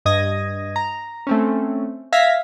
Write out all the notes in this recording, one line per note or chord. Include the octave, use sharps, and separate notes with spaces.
G2 D#5 D#6 G#6 A#6
A#5
A3 C4 C#4
E5 F5 G#6 A#6 B6